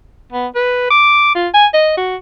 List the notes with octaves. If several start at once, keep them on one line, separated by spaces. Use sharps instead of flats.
B3
B4
D6
F4
G#5
D#5
F#4